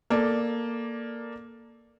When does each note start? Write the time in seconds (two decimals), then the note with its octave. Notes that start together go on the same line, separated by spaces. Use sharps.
0.10 A#3 A4 D5